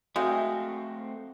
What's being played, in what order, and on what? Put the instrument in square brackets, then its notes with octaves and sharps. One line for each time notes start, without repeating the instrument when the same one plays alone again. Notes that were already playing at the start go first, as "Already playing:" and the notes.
[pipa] G#3 [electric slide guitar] A3 C4 [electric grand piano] F#4 [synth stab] E5 F5 G5